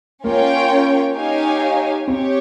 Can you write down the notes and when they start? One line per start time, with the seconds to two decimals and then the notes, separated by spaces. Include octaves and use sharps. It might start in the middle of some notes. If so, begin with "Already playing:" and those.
0.24 A#3 C#4 F4 A#4 C#5 G5
1.16 D#4 G4 C#5 F5 G#5
2.08 C4 G4 C#5